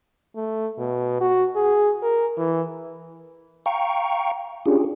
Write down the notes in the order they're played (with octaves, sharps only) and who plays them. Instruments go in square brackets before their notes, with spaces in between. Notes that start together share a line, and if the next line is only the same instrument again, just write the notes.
[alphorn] A3
B2
F#4
G#4
A#4
E3
[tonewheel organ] F5 G5 A#5 C#6
C#4 D4 F4 G4 G#4